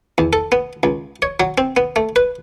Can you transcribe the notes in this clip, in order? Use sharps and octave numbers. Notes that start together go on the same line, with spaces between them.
E2
A4
B3
C#2
C#5
F#3
C4
B3
A3
B4